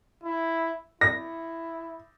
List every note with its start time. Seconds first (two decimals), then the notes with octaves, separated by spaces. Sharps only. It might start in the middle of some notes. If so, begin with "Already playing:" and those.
0.23 E4
1.01 E4 A#6